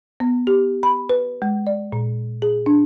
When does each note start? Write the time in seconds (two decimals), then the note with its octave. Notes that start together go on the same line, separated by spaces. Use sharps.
0.20 B3
0.47 G4
0.83 B5
1.10 B4
1.42 G#3
1.67 D5
1.92 A#2
2.42 G#4
2.66 D4